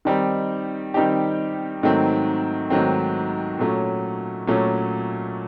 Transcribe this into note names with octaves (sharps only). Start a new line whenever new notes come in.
D#3 G3 C4 D#4 G4
D#3 G3 C4 D#4 G4
G#2 D#3 F#3 A3 C4
G#2 D#3 F#3 A3 C4
A#2 F#3 A3 C#4
A#2 F#3 A3 C#4